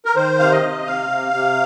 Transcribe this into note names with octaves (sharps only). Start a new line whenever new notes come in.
A#4
D#3 C5
C3 F5
D#5
C3
C3 F5
C3
C3